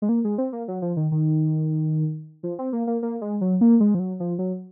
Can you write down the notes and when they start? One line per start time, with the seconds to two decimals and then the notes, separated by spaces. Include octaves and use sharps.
0.02 G#3
0.09 A#3
0.24 G#3
0.38 C4
0.53 A#3
0.68 F#3
0.82 F3
0.97 D#3
1.12 D#3
2.43 F3
2.59 C4
2.73 A#3
2.87 A#3
3.03 A#3
3.21 G#3
3.41 F#3
3.61 A#3
3.80 G#3
3.95 F3
3.99 F#3
4.20 F3
4.39 F#3